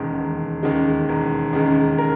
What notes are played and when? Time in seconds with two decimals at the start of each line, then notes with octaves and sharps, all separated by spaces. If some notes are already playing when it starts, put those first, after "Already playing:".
Already playing: E1 D#2 C#3 G#3
0.18 E1
0.63 D#2 C#3 G#3
1.09 E1
1.53 D#2 C#3 G#3
1.98 A#4 A#5